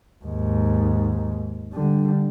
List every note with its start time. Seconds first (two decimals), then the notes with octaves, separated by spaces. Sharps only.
0.25 D#2 G#2
1.73 D3 G3